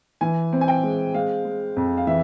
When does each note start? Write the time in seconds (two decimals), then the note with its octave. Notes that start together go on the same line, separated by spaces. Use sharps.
0.21 E3 G#5
0.53 C4
0.61 G#5
0.68 G5
0.83 G#3
1.14 G#3 F5
1.45 G#3
1.76 F2
1.97 F5
2.07 E3 E5